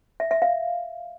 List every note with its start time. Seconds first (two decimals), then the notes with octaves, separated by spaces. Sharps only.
0.20 E5
0.31 E5
0.42 F5